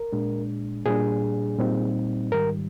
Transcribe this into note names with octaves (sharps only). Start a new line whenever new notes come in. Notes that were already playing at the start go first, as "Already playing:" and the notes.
Already playing: A#4
A#2 G#3 D4
A#2 G3 D4 G#4
A#2 G3 C4 D#4
G#2 D#3 G3 A#4